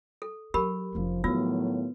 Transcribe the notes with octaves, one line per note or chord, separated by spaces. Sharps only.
A4
F#3 G4 A#4 B5
F1 F3 C#4
A2 D#3 F3 F#3 B3 F4 E6